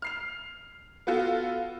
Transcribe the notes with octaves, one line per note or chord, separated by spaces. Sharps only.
F6 C7 F7
B3 F4 F#4 A4